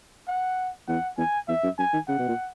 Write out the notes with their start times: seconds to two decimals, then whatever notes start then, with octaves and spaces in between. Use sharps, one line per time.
0.28 F#5
0.88 E2 F#5
1.18 E2 G#5
1.48 E2 E5
1.63 F#2
1.78 F#2 G#5
1.93 D#3
2.08 C#3 F#5
2.19 B2
2.28 A#2